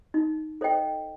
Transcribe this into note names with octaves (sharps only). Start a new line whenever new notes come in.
D#4
A4 C5 D#5 G5